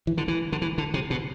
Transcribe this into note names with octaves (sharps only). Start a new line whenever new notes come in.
E3
D3
E3
D3
E3
D3
C3
B2